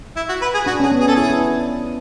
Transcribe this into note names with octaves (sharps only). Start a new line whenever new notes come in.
E4
F#4
B4
G#4
D4 F#4
C#4 G#4
B3
G#4
C#4 A4
E4 G#4
D4
D4